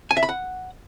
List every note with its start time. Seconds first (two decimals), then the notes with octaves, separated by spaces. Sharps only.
0.11 G#5
0.17 E5
0.23 B5
0.29 F#5